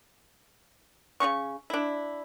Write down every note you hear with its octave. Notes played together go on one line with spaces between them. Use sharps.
C#3 F3 C#4 C#6
D4 E4